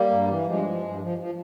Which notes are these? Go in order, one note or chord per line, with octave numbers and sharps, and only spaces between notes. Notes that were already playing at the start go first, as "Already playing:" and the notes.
Already playing: G3 A#3
G2
E3
G2 F3 G#3
F3
G2
F3
F3